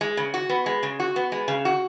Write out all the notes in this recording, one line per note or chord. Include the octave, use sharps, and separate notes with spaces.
G#3
C#3
F#4
B3
G#3
C#3
F#4
B3
G#3
C#3
F#4